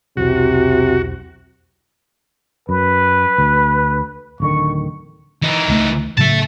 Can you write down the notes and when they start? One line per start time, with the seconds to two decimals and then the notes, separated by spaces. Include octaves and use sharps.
0.17 B1 E2 C3 E3 F#4
2.69 F#2 B4
3.38 D2
4.40 D1 D3 D#3 C#6
5.42 E3 D#4
5.68 C#2 F#3 A3
6.18 A2 C#3 F#3 E5 A5